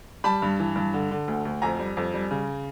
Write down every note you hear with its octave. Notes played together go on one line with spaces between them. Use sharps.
G3 A5 B5
G2
E3
G2
D3
D3
D2
D2
F2 G#5 A#5
G3
F2
G3
C#3